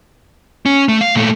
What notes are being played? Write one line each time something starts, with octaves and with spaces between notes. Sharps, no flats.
C#4
A3
F5
A#2 A3